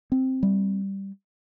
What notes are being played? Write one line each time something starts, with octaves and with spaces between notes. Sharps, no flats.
C4
G3